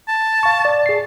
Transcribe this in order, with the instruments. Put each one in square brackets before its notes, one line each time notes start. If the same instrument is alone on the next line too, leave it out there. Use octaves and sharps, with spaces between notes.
[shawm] A5
[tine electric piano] F5 C#6
D5 A6
G#4 C7